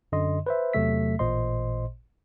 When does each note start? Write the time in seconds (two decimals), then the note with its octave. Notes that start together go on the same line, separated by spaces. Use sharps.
0.12 F#2 D3 D#5 C6
0.46 B4 C5 E5
0.73 E2 C3 F#3 A3 E5 B6
1.19 A1 A#2 C5 D#5 C6